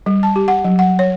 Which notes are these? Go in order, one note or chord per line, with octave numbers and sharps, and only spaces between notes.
G3
A5
G4
F#5
F#3
F#5
C#5